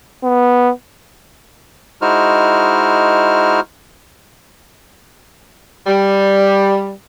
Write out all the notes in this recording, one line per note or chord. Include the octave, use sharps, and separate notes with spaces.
B3
G#3 D#4 E4 F#4 C5 F6
G3